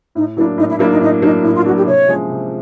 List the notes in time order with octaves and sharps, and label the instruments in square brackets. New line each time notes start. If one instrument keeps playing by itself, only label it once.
[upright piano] A2 [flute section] D#4
[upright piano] F#3 A#3 D4 [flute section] E4
[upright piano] A2 [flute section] D#4
[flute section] E4
[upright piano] F#3 A#3 D4 [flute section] E4
[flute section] D#4
[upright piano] A2 [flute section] D#4
[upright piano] F#3 A#3 D4 [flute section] D#4
[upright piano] A2 [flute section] E4
[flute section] F4
[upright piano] F#3 A#3 D4 [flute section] F#4
[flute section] G4
[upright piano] C3 [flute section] C#5
[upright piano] F3 G#3 C#4
C3